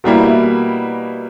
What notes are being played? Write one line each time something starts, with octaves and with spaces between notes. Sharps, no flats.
B2 G3 A#3 E4